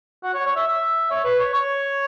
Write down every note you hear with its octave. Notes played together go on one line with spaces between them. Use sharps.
F#4
C#5
C#5
E5
E5
C#5
B4
C#5
C#5